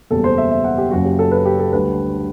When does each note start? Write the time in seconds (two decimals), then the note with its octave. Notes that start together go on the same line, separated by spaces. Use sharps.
0.10 F#1 E2 B2 G3 A4
0.24 C5
0.38 E5
0.51 E5
0.64 F#5
0.78 G4
0.91 F#1 F#2 F#3 F#4
1.05 G4
1.19 A4
1.31 B4
1.45 G4
1.59 A4
1.72 D2 D3 G3 B4